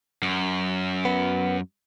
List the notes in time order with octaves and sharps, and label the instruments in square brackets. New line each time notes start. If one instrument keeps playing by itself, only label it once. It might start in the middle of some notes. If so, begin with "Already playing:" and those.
[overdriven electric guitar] F#2
[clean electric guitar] B3